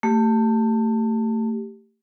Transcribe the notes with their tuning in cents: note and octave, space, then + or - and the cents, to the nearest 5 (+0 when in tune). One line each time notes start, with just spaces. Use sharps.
A3 +25 G4 +0